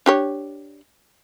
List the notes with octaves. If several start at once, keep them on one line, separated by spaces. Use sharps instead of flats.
D4 G4 C#5